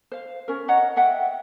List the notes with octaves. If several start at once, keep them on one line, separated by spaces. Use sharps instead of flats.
C5 F5
C#4 A#4
C#5 D#5 F#5 A#5
D#5 E5 F#5 G5